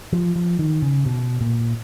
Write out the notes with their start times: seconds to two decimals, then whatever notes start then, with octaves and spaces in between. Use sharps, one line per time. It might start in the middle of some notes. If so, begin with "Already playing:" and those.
0.13 F3
0.36 F3
0.59 D#3
0.82 C#3
1.06 B2
1.41 A#2